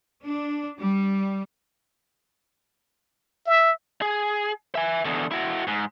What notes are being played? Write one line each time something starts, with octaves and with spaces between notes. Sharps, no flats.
D4
G3
E5
G#4
E5 G#5
E2 D3
E4 F#4
G#2